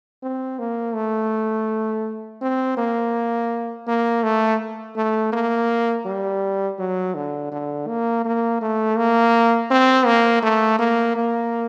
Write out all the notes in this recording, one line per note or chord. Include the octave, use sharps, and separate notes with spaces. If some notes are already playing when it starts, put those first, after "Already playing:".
C4
A#3
A3
C4
A#3
A#3
A3
A3
A#3
G3
F#3
D3
D3
A#3
A#3
A3
A#3
C4
A#3
A3
A#3
A#3